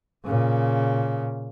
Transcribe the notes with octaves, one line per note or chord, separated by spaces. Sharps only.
A#2 C#3